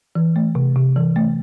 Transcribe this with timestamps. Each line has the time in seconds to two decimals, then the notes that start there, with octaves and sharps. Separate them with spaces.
0.15 E3
0.36 A3
0.55 C3
0.76 C3
0.96 E3
1.16 A3